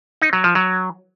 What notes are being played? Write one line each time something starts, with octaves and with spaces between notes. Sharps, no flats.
D#4
F#3
F3
F#3